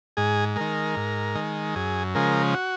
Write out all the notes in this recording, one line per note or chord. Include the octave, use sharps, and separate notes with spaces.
G#2 G#4
D#3 G#3 A#4
G#2
D#3 G#3
F#2 G#4
C#3 F3 G#3 A#4
F#4